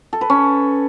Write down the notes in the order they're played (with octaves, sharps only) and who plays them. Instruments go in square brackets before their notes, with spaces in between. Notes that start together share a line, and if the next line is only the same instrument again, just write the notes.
[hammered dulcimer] A4
B4
C#4